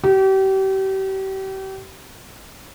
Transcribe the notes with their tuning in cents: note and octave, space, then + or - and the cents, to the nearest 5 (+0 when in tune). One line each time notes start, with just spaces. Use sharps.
G4 -35